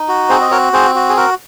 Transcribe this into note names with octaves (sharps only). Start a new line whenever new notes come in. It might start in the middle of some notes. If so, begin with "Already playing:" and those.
Already playing: D#4
F#4
C4 G#4 C5
D#5
F#4 A#4 C#5
C4 G#4 C5
F#4
G#4
F#4 A#4